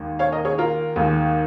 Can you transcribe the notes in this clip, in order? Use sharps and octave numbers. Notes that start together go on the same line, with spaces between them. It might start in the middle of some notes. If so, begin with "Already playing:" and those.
Already playing: D#2 D#3 G#3
C#5 F5
A#4 D#5
G#4 C#5
F4 A#4
D#2 D#3 G#3